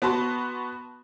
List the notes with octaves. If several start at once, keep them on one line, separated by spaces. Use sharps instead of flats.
B3 F#4 A5 C6